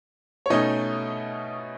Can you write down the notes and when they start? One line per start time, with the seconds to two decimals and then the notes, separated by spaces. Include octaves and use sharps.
0.46 C#5
0.50 B2 A3 C#4 D#4 D#5